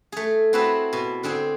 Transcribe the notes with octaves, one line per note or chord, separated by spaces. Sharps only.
A3 G#4
C4 E4 F#4 G#4 A4 B4
B2
D3 C4 G#4 G5